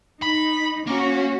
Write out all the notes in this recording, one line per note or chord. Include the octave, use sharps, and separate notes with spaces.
D#4 B5
A#3 C#4 F#4